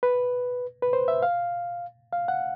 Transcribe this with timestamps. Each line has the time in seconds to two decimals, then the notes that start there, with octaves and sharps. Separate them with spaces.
0.03 B4
0.82 B4
0.93 C5
1.08 E5
1.23 F5
2.13 F5
2.28 F#5